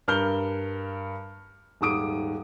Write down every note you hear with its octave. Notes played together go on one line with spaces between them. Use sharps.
G2 A#4 F6 G6 G7
D#1 G#2 D6 D#6 D7